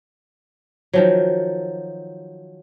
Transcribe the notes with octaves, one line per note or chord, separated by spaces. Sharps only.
D#3 F3 F#3